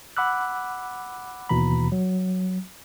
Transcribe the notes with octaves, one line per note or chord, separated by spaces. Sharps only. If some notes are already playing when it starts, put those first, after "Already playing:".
F#5 B5 D6 E6 F#6
D#2 B2 E3 A#5 B5
F#3